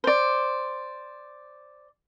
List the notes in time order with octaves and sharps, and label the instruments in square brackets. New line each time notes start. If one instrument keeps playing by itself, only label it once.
[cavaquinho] C5 D5